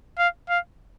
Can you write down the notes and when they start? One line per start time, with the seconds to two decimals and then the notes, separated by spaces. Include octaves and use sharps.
0.18 F5
0.49 F5